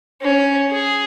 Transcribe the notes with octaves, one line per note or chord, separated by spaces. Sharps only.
C#4
G#4